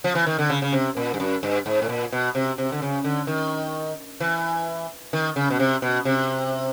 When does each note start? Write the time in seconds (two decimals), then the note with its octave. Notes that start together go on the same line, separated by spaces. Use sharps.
0.04 F3
0.15 E3
0.27 D#3
0.39 D3
0.50 C#3
0.62 C#3
0.73 C3
0.97 A#2
1.14 G2
1.20 F#2
1.43 G2
1.66 G#2
1.82 A2
1.89 A#2
2.12 B2
2.35 C3
2.58 C3
2.72 D3
2.82 C#3
3.04 D3
3.27 D#3
4.20 E3
5.13 D#3
5.36 C#3
5.50 B2
5.59 C3
5.82 B2
6.05 C3